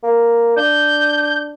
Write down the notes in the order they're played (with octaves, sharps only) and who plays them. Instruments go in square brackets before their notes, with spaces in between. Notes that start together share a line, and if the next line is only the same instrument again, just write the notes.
[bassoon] A#3
[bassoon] D4 [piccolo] G6